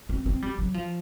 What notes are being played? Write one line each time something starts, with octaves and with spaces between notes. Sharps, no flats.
C4
C4
G3
F#3
F3